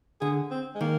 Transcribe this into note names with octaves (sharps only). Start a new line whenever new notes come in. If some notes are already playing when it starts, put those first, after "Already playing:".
D3 G#4
C4
G#3
D#3 A#3